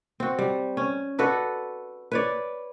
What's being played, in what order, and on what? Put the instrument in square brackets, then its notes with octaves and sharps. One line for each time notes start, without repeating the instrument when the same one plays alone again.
[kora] C4 F#4
G3
C#4
F#4 A4 B4 D5
B4 C#5 D5